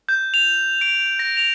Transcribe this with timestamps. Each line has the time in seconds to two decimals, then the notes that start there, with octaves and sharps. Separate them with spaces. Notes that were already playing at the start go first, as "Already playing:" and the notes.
0.09 G6
0.34 F7
0.81 D7
1.19 A#6
1.37 F7